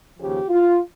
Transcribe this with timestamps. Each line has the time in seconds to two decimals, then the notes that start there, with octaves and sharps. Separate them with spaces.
0.19 D#2 C#3 F3 G4
0.49 F4